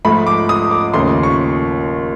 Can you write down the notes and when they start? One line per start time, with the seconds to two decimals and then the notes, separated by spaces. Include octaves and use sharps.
0.05 G#2 F3 A3 B5
0.27 D6
0.49 D#6
0.71 D6
0.93 D#2 C#3 F3 A3 C6
1.23 C#6